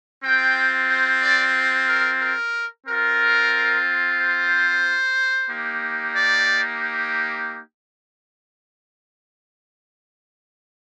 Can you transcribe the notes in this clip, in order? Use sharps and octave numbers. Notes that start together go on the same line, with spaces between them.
C4 F4 G5
C5
D5
C5
A#4
A#4
C4 F4 A#4
C5
A#3 D#4 G4
D5